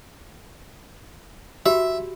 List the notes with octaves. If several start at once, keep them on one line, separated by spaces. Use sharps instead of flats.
F#4 G4 E5 B5